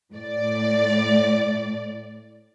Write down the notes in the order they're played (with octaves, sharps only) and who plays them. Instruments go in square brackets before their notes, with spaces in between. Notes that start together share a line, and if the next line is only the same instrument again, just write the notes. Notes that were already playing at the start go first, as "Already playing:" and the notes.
[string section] A2 D5